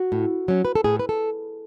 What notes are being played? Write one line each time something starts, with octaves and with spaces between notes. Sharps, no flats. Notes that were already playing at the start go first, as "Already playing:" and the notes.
Already playing: F#4
A2
F#3 C#4
B4
A4
A2 G#4
B4
A4